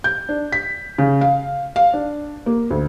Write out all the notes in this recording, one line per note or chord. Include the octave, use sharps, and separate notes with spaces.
G6
D4
B6
C#3
F5
F5
D4
A#3
D2